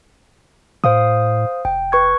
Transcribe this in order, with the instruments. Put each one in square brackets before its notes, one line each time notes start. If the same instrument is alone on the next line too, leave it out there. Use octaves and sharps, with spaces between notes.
[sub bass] A2 [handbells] C5 F5 D#6
[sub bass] F1 [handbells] G5
[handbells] B4 C#6 G#6